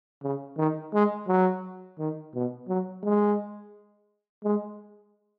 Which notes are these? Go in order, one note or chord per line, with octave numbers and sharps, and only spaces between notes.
C#3
D#3
G#3
F#3
D#3
B2
F#3
G#3
G#3